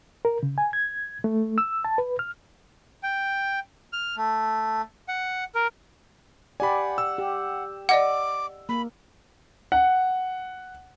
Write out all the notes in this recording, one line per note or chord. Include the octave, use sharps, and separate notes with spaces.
A#4
C#3
G#5
G#6
A3
E6
A5
B4
F6
G5
F6
A3
F#5
A#4
G4 D5 F#5 G#5 B5
E6
G4
D5 D#5 F#5 D6
A#3 B5
F#5